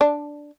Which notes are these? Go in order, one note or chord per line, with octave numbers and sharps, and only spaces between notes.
D4